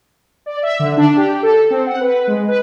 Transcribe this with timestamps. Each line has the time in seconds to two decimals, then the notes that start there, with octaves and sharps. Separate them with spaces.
0.46 D5
0.63 E5
0.79 D3
0.97 D4
1.17 G4
1.43 A4
1.70 C4
1.87 F#5
2.01 B4
2.27 G#3
2.48 B4